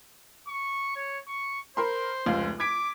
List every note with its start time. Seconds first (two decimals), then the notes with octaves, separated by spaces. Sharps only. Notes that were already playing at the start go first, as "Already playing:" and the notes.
0.48 C#6
0.96 C#5
1.28 C#6
1.77 A#4 C5 B5 C6
2.26 F1 C#2 F5
2.60 D6 G#6 B6 D7